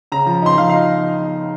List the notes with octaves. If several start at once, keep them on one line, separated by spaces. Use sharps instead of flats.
C#3 A#5
F3
D#4 C6
F3 F5
D#4 F5